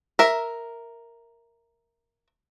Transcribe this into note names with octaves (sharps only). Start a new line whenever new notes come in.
A#4 E5